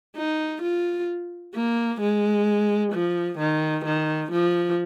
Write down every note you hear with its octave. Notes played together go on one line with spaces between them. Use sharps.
D#4
F4
A#3
G#3
F3
D#3
D#3
F3